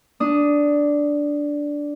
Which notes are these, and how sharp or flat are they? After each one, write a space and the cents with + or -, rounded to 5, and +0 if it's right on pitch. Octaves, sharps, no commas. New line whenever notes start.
D4 -5 D#6 +5